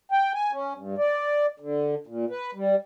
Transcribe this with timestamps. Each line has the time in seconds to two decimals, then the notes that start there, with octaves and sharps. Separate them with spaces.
0.12 G5
0.34 G#5
0.52 C#4
0.75 G2
0.98 D5
1.60 D3
2.07 A#2
2.30 B4
2.55 G3